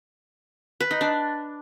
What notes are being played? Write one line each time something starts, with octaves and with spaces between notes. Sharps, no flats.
B4
D#4
D4